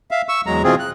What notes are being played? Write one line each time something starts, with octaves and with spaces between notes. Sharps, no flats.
E5 F5
C#6 E6
E2 F#3 G#3 A#5
B2 E3 C4 F4 G#4
F#6